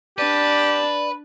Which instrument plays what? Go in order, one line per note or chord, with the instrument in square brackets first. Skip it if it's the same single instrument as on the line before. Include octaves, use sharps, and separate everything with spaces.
[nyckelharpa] D4 A5 [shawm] G4 [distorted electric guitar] B4 [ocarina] D5